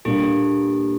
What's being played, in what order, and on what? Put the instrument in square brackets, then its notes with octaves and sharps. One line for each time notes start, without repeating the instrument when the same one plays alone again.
[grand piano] A#2 G3 A#3 D4 [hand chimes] G4 A4